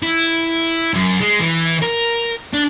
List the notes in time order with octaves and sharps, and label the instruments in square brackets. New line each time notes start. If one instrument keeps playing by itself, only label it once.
[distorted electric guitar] E4
F#2
G#3
E3
A#4
D4